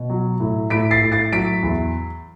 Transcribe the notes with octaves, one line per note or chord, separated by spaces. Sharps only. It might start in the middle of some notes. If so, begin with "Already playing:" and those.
Already playing: B2
F#3
A2
A2 B6 D7
A6 C7
A2
A6 C7
F#3 B6 D7
E2